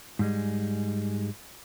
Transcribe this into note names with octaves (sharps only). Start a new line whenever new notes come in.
G#2 G3 G#3